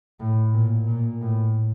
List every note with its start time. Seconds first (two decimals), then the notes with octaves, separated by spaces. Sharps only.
0.20 A2
0.54 A#2
0.87 A#2
1.21 A2